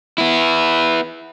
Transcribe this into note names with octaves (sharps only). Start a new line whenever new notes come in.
B3 E4